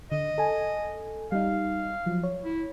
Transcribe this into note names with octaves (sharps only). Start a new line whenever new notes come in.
D3 D#5
A4 G#5
G3 D#4 F5
F3 F#3
C#5
E4